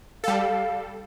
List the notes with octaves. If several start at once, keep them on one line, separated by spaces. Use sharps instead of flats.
G3 A4 F5